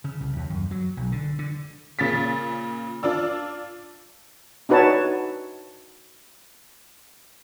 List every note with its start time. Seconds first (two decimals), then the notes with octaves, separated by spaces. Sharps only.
0.04 C#3
0.21 C2
0.37 D#2
0.50 F#2
0.71 F#3
0.97 B1
1.12 D3
1.39 D3
1.99 A#2 C#3 A6 B6
3.03 D4 F4 D5 E6
4.69 D4 D#4 F#4 B4 C#5 A5